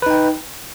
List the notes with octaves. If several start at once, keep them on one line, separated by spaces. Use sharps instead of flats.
D#4 B4 G5